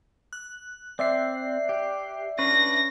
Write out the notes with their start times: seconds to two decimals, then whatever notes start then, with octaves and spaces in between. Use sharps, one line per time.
0.33 F#6
0.99 C4 D5 E5 C7
1.69 G4
2.39 C#4 D4 B4 A#6